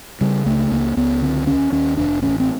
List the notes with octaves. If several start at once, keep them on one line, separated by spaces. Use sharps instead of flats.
C#3 G3
C#2 A3
C#2 A#3
C#2 B3
D3 C4
D#2 C#4
D#2 C#4
F1 D4
A1 C#4
C4